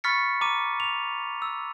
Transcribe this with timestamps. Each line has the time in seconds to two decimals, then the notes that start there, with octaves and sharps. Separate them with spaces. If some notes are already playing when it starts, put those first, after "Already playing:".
0.04 B5 C#6 F6 A6 B6 C#7
0.41 A#5 D6 D#7
0.80 F7
1.42 E6